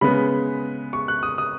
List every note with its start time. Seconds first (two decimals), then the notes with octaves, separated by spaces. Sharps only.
0.01 C#3 G#3 B3 B5
0.93 C#6
1.08 F#6
1.23 D#6
1.38 D#6